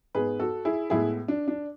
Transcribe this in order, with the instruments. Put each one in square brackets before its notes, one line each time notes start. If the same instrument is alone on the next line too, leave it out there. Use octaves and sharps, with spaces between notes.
[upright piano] G#2 G#3 B3 G#4 B4
F#4 A4
E4 G#4
A2 G#3 B3 E4 G#4
D4
D4